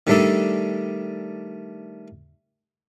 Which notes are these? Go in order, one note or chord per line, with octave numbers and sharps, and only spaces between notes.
D#3 G3 A3 D4 D#4 A4